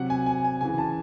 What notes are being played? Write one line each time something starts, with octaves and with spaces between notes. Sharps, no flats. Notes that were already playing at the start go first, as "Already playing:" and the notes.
Already playing: C3 F#3 F#5
G#5
G#5
G#5
C#3 E3 G#5
A5